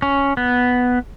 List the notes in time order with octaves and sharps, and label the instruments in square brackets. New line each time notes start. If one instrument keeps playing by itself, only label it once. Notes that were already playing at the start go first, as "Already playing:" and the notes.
[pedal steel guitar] C#4
B3